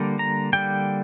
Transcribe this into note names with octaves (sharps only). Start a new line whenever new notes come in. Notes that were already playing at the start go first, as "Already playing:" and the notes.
Already playing: D3 G3 A#3
A#5
D3 G3 A#3 G5